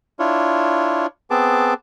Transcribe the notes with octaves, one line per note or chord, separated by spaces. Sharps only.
D4 E4 F4 C#5
B3 C4 G#4 A5 D6